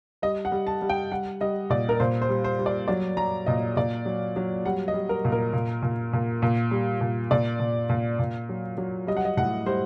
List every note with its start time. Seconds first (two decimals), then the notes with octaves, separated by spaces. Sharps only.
0.22 G3 D#5
0.45 F#5
0.52 G3
0.67 A5
0.82 G3
0.89 G5
1.11 G3 F#5
1.41 G3 D#5
1.70 A#2 D5
1.89 A#4
2.00 A#2 C5
2.22 C5
2.29 G3
2.44 C5
2.59 G3
2.66 D5
2.88 F#3 D5
3.17 F#3 A#5
3.46 A#2 D#5
3.76 A#2 D5
4.05 F#3
4.36 F#3
4.65 G3 F#5
4.88 D#5
4.94 G3
5.09 A#4
5.25 A#2
5.32 A#4
5.53 A#2
5.83 A#2
6.13 A#2
6.42 A#2
6.71 G3
7.01 A#2
7.31 A#2 D5
7.60 A#2
7.89 A#2
8.19 A#2
8.49 F#3
8.78 F#3
9.07 G3 D#5
9.17 F#5
9.25 D#5
9.37 A2 F#5
9.66 G3 C5